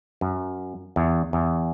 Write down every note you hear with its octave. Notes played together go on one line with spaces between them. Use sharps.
F#2
E2
E2